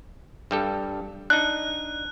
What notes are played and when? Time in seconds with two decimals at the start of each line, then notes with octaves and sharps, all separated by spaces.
0.51 G2 G3 A4
1.30 D4 D#4 F#6